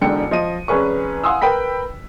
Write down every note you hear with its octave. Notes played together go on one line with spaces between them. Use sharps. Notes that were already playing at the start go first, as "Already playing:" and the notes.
E1 G#2 D3 G5 C#7
F3 D#5 D#7
F1 C#4 G#4 B4 C#6
F5 F#5 G#5 C6 D#6 E6
A#4 B4 G5 B5 B6